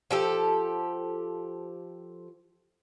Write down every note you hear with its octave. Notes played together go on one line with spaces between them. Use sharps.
F3 G4 A4